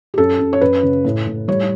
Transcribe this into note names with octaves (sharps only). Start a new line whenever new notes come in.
G4
F#2 A4
F#2
C#5
F#2 B4
C#3
A2
A2
G3 C#5